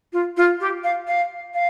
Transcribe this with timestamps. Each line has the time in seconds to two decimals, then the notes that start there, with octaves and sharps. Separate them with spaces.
0.12 F4
0.36 F4
0.60 G4
0.83 F5
1.07 F5
1.53 F5